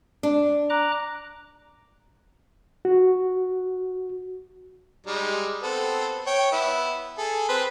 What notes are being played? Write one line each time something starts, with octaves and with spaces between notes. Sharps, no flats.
D4
A#5 D6 F#6
F#4
G3 G#3 D#4
B3 C4 A4
C#5 G5
B3 E4
G#4 A4
C4 B4